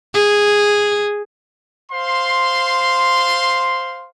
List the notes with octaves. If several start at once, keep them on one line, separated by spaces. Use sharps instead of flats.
G#4
C5 F5 C6